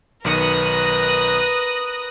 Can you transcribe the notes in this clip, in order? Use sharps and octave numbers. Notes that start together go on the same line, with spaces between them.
B1 D#3 A#4 B4 D#6 F#6 A#6 C#7